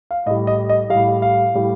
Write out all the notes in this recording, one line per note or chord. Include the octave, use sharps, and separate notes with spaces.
F5
A2 G3 D#5
D#5
D#5
A2 G3 F5
F5
A2 G3